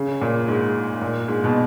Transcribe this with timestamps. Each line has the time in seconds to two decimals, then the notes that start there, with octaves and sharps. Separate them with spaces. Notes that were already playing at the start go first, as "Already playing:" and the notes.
Already playing: C#3
0.21 A#2
0.48 G#2
1.02 A#2
1.28 G#2
1.44 B2